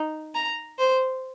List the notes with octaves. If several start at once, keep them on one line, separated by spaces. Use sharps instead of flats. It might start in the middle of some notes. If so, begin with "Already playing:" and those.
Already playing: D#4
A#5
C5